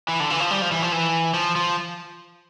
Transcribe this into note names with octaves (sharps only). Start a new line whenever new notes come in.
E3
D3
E3
F3
G3
F3
E3
F3
E3
F3
F3